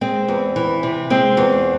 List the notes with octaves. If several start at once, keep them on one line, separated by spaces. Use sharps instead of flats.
G#3 C4
E2
E3
C3
G#3 C4
E2